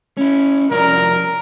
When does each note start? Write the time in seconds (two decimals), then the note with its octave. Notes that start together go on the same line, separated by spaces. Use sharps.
0.17 C#4 E4
0.71 C2 F2 A#4 D5